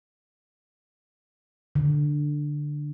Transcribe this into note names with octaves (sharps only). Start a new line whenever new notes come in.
D3